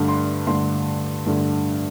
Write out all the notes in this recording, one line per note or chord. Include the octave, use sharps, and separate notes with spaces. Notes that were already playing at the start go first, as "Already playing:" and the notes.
Already playing: G2 D3 A3
C6
G2 D3 A3 C6
G2 D3 A3